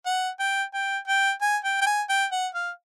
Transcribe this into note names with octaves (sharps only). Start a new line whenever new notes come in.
F#5
G5
G5
G5
G#5
G5
G5
G#5
G5
F#5
F5